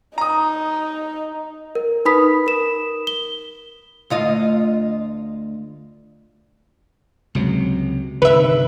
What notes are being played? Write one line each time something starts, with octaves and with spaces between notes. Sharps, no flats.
D#4 A#5 D#6
A#4
D#4 B4 B5 D#6 B6
A#4 E7
G7
D2 F4 D#5
C#2 C3 F#3
G1 C2 D#3 B4 E5